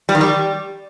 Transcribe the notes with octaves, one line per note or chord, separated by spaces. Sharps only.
G3
D#3
G3